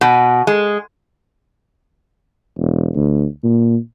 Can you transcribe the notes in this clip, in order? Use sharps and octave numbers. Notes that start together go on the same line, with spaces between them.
B2
G#3
E1
D2
A#2